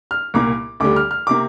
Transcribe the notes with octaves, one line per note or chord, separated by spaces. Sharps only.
F6
C2 A#2 A#3 D6
D2 D3 G3 D6
F6
F6
C3 A#3 D6